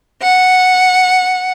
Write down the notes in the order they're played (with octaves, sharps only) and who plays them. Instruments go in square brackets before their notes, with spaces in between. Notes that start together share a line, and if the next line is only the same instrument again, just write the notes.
[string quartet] F#5